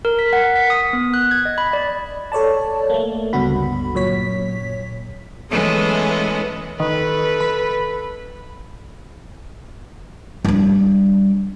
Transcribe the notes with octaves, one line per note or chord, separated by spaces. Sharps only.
A#4
B6
F#5
B6
D#6
B3
F#6
G#6
D#5
B5
D5
A4 C#5 D5 A5
A3 A#3
C#2 G2 D3 B3 F#4 B5
F#2 A#2 C#5 B6
E3 G#3 A3 B3 C#4
D#3 A4 B4
B5
G3 D4